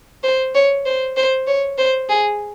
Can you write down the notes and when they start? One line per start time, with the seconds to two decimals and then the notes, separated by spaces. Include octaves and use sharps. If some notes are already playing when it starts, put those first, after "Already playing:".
0.23 C5
0.55 C#5
0.85 C5
1.17 C5
1.47 C#5
1.78 C5
2.09 G#4